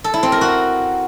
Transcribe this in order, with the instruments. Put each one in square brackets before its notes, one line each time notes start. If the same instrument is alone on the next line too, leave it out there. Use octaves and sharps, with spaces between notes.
[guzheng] A4
E4
C4
A#4
F#4